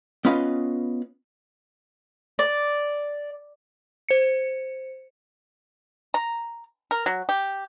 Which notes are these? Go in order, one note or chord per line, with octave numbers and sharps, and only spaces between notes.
B3 C#4 F4 B4 D#5 F5
D5
C5 C#7
A#5
A#4
F#3
G4